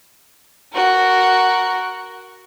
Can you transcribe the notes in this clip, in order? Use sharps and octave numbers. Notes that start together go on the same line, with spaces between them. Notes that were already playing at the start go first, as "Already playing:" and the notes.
F#4 A#4